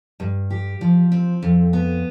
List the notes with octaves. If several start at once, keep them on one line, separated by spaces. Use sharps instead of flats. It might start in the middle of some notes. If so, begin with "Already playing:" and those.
G2
G4
F3
C4
F2
B3